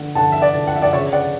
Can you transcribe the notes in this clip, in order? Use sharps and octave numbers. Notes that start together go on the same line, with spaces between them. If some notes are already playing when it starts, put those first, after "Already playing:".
Already playing: D3 F#5
D3 F#5 A5
E5
D5 F#5
D3
F#5
E5
D5 F#5
C#3 C#5 E5
D5 F#5